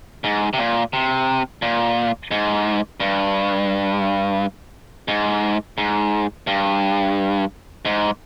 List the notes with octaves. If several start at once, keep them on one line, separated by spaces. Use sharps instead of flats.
G#2
C3
A#2
C3
A#2
G#2
G2
G#2
G#2
G2
G#2